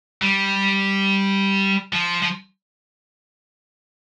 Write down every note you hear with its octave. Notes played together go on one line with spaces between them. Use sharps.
G3
F3
F3